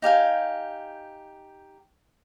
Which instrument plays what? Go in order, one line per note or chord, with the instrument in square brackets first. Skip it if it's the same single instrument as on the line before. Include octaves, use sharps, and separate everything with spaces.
[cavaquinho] D#4 G4 F5 G#5